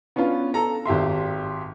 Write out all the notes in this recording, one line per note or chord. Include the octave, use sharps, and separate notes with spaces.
B3 C#4 D4 F4 B4
A4 A#5
G#1 G4 E5 C6